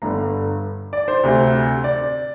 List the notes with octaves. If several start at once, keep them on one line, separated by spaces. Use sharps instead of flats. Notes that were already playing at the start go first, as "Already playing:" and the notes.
G1 G2 D3 A#5
D5
C5
D2 C3
D5